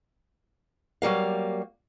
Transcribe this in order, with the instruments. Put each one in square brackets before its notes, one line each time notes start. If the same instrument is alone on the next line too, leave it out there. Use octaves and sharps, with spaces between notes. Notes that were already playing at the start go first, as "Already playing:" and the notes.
[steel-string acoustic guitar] F#3 G3 A#3 F5